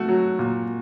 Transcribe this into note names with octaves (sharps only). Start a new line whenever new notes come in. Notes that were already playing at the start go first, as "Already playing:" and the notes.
Already playing: A3 F#4
F#3
A#2